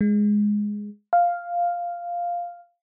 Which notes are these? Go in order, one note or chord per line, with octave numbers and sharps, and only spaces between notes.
G#3
F5